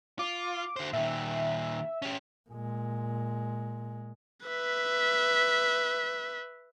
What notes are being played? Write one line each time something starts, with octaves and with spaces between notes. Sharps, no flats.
F4 D6
D3 C5
A#2 D#3 E5
C#4 G4
A#2 G#3
B4 E5